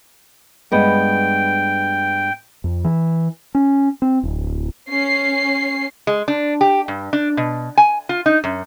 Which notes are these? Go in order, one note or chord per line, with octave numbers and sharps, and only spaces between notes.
G2 G#3 B3 G5
F2
E3
C#4
C4
D1
C#4 C7
G#3
D4
G4
G2
D4
B2
G#5
F4
D#4
F#2